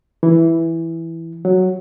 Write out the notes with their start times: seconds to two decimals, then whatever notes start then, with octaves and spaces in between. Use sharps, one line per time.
0.23 E3
1.45 F#3